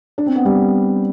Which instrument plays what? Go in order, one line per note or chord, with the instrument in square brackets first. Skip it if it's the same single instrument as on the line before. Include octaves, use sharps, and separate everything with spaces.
[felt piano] D4
C4
B3
G3